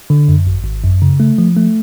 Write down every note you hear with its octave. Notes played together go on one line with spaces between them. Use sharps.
D3
F#2
G#1
G#1
F#2
C#3
A3
F3
A3